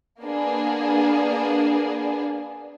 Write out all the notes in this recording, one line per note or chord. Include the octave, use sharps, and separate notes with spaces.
A#3 B3 D4 G#4